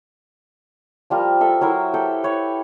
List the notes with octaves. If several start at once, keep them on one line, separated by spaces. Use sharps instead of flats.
F3 G3 F4 A#4
A4 E5
F#3 E4 A#4 C5
G4 A4 G5
B4 C#5 G5